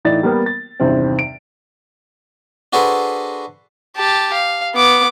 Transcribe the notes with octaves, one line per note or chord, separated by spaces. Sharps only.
A2 E3 D#4 D5 A6
G3 A#3 B3 A#4 G5
A6
E2 G2 C3 D#3 C4
D7
D4 F#4 G#4 A4 B4 C5
G4 A5
F5
B3 D6